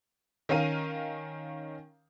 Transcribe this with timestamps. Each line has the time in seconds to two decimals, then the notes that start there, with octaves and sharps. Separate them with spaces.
0.49 D#3 C#4 A#4 F5 D#7